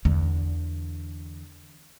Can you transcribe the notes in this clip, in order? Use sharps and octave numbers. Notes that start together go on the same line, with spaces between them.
E2 D3